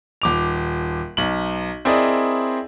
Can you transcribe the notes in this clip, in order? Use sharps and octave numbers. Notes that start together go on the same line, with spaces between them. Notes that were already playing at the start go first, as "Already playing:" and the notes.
D#1 D6 F7
B1 F#7
C4 E4 G#4 A#4 D5 D#5